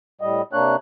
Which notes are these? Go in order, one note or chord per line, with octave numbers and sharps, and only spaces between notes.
A2 G3 D#5
C3 A#3 D4 C#5 F#6